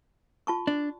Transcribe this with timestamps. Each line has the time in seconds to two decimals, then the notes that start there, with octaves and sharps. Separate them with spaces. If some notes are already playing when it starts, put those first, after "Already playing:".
0.47 F4 A5 C#6
0.67 D4